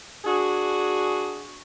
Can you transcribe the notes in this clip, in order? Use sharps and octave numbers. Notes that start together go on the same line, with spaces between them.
D4 F#4 G#4